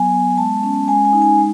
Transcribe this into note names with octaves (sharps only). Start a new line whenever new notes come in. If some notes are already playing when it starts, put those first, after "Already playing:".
Already playing: F#3 B3 G#5
B3
G#3 A5
C#4
G#3 G#5
G#5
D#4
G#5
G#3